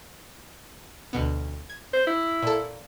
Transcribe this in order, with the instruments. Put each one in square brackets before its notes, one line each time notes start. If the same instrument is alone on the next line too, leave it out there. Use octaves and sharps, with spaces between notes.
[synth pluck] D2 B2 B3
G#6
[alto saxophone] C5
E4
[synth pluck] A#2 A4